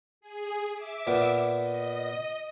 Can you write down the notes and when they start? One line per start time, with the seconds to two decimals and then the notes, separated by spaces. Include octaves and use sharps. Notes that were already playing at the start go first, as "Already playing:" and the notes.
0.21 G#4
0.73 E5 D6
1.07 A#2 B3
1.60 D#5